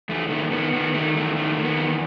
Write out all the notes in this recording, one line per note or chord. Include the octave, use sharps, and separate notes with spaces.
E2 A3
D#3 A3
D#3 B3
D#3 B3
D#3 A3
E2 A3
D#3 A3
D#3
B3
E2